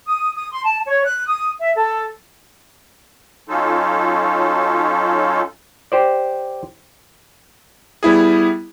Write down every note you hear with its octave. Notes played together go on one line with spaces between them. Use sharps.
D#6
D#6
C6
A5
C#5
F#6
D#6
E5
A4
F#3 C#4 D#4 F4 A4
G4 C5 D5
G3 B3 E4 G#4